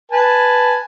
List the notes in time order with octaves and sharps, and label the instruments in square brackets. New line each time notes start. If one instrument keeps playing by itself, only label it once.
[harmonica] B4 G#5 A5